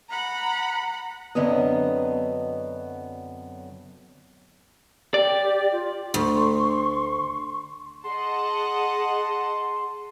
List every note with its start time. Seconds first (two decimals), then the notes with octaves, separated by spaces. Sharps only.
0.11 F#5 A#5 B5
1.35 F#2 D3 F#3 B3 C4 D#5
5.14 G4 D5
5.72 F4
6.14 D2 C6 C#6
8.04 G#4 D#5 F#5 A5 C6